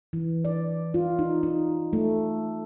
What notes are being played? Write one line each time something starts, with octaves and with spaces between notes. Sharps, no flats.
E3
D5
F4
D#4
D#4
A3